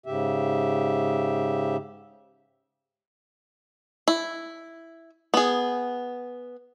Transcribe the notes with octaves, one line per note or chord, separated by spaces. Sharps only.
G#2 C#3 G4 E5
E4
B3 G#4